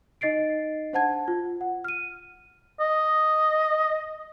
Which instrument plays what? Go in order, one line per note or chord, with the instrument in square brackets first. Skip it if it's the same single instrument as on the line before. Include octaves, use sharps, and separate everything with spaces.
[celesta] D#4 D#5 A6 C7 D7
D4 C5 F#5 A5 G#6
F4
F#5
F6 D#7
[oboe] D#5